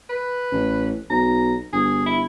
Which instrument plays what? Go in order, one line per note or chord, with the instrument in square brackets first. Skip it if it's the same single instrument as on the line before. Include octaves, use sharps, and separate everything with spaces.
[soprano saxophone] B4
[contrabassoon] A1
[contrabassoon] B1 [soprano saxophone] A#5
[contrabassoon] G1 [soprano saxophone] G#4
[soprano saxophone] E4